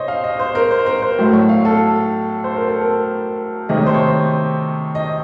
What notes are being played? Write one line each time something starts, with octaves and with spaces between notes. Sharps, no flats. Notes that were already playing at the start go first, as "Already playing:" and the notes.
Already playing: C3 C5 C#5 D#5
F5
D#5
C5
A#4
C5
A#4
C5
A2 F#3 A3
C#5
F5
A4
C5
A#4
A4
A#4
C3 D#3 A3 D#5
C#5
C5
C#5
D#5